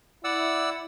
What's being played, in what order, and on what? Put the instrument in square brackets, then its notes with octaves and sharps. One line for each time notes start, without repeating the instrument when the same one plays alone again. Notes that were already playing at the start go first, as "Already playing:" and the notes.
[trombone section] E4 [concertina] D5 F#5 E6